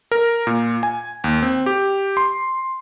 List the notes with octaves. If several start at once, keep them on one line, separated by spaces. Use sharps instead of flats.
A#4
A#2
G#5
D#2
C4
G4
C6